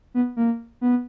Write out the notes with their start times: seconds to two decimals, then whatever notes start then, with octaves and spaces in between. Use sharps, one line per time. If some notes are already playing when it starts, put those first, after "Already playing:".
0.14 B3
0.36 A#3
0.81 B3